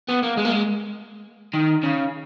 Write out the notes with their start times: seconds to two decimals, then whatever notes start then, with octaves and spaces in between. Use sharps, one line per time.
0.08 B3
0.23 A#3
0.37 G#3
0.45 A#3
0.52 G#3
1.54 D#3
1.83 C#3